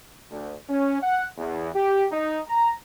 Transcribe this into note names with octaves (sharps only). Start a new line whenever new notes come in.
D2
C#4
F#5
E2
G4
D#4
A#5